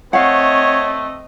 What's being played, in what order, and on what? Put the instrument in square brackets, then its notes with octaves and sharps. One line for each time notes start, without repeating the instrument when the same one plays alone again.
[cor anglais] A3 [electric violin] C4 D#5 [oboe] C#5 [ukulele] F5 F#5